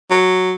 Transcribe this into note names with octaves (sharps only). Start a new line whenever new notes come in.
F#3